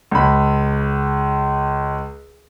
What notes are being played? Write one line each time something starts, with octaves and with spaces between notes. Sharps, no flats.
C#2 B5